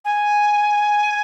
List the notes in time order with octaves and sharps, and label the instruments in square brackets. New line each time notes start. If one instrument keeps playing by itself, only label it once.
[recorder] G#5